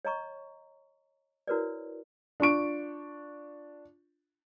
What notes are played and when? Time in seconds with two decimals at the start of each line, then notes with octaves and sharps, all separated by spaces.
0.05 C#5 D#5 A#5 C#6
1.47 E4 F#4 A#4 B4 C#5 D5
2.40 D4 F4 C#6 D7